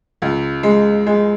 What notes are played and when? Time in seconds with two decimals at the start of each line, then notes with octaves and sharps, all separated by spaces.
0.22 C#2
0.63 G#3
1.06 G#3